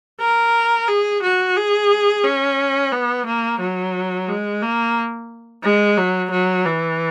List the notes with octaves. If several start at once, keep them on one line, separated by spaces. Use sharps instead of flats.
A#4
G#4
F#4
G#4
C#4
B3
A#3
F#3
G#3
A#3
G#3
F#3
F#3
E3